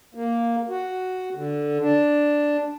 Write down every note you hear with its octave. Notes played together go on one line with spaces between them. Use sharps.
A#3
F#4
D3
D4